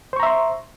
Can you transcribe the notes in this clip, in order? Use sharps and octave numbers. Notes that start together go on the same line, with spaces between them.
C5 E5 A#5 C6 C#6